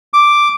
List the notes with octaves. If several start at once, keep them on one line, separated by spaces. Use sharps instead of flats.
D6